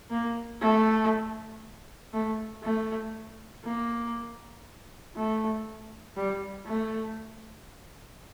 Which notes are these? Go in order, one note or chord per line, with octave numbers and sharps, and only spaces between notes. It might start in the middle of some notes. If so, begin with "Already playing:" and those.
A#3
A3
A3
A3
A#3
A3
G3
A3